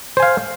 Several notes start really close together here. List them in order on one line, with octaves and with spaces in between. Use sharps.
C5 G#5 F5